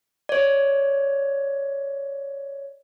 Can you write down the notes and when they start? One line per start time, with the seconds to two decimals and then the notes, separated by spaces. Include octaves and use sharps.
0.29 C#5 D5